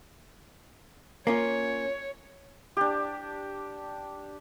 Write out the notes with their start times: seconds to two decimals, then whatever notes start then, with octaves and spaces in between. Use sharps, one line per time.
1.27 A#3 C#4 F4 C#5
2.77 D4 G4